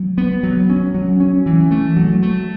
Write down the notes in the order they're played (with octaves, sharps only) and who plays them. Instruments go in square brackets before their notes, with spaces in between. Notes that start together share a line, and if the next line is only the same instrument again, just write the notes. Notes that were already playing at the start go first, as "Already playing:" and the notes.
Already playing: [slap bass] F#3
B3
F#3
C#4
F#3
C#4
E3
A3
F#3
A3